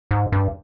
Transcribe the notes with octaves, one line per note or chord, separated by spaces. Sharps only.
G#2
G2